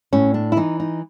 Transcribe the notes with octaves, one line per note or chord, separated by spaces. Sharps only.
A2 C#4
D4
E4
E3 D#4
D#4